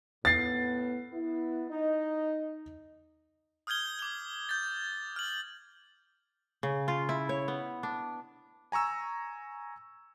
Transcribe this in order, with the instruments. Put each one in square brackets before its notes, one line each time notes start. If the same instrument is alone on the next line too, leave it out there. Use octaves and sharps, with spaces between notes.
[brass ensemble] A2 B3 [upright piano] A6 C7
[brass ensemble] B3 E4
D#4 D#5
[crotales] D#6 F6 G6 G#6 G7
D6 G7
G6 A6
F6 F#7
[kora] C#3
F4
E4
C#5
B3
D4
[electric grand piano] G#5 A#5 C#6 E6